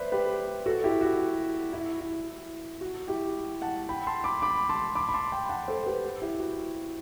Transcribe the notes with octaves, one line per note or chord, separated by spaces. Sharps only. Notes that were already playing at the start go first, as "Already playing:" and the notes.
Already playing: B4 C5 D5 E5
G4 B4
F#4 A4
E4 G4
F#4
E4
E4
F#4
E4 G4
F#5 A5
G5 B5
A5 C6
B5 D6
B5 D6
A5 C6
B5 D6
B5
A5 C6
G5 B5
F#5 A5
A4 C5
G4 B4
E4 G4
F#4